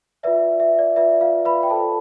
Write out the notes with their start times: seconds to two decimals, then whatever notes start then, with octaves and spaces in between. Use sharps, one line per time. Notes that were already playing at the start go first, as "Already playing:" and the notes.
0.23 F4 B4 D5 E5
0.60 E5
0.79 D5
0.96 F4 B4 D5 E5
1.21 F4 F5
1.45 B4 B5
1.63 G5
1.70 F4 A4 C5 A5